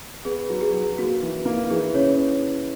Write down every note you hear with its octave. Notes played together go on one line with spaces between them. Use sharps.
B3 G#4
F#3
G#4
F#3
A#3 F#4
E3
A#3
E3 G#4
C#3 C#5